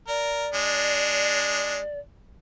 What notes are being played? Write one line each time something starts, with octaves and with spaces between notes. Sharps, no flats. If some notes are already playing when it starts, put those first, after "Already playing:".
A#4 D5
G#3 D4